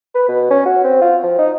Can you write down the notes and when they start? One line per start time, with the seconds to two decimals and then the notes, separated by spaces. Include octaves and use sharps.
0.15 B4
0.28 B2
0.51 C#4
0.66 F#4
0.84 C4
1.01 F4
1.23 F3
1.38 D#4